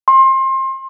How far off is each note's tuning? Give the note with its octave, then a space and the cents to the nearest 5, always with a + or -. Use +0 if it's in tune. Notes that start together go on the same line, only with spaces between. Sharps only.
C6 +30